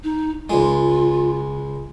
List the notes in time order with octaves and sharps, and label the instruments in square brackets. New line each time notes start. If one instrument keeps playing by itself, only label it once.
[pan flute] D#4
[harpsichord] C#2 G#3 [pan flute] F4